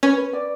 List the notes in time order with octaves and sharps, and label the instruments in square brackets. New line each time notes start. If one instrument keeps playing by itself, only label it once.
[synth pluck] C#4 [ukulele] B4
[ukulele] B4
D5